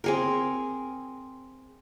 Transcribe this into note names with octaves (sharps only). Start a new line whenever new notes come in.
C4 G#4 A#4